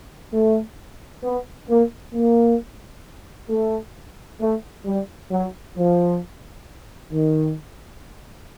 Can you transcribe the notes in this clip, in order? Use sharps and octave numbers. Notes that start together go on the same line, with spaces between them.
A3
B3
A#3
A#3
A3
A3
G3
F#3
F3
D#3